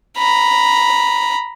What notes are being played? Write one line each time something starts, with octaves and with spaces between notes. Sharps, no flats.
A#5 B5